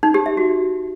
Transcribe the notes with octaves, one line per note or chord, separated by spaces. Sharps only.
D#4
G4
E5
F#4